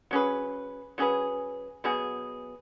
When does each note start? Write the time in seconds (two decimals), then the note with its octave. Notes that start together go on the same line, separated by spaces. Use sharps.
0.11 F#3 C#4 G#4 B4
0.98 F#3 C#4 G#4 B4
1.84 B2 F#3 B3 G#4